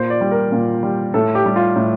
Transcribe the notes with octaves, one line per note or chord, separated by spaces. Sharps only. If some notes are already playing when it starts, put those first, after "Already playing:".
Already playing: A#2 C5
D5
G3
A#4
A#2
G3
A2 A4
G4
G3
F4
A2